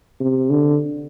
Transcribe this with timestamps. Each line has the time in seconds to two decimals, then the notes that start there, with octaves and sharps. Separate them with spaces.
0.21 C3
0.50 D3